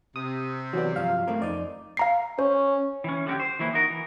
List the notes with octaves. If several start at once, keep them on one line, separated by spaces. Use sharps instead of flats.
C3 D#6
E3 F#3 B3 D5
G2 F3 F#3 F5
A3 C4 A#4
F2 D#4 D5
F5 A#5 C7
C#4 C5
E3 C#4
D3 F#3 F#4 G4
C5
E3 F#3 A#3 E4
D#4 F#4 A#4
E3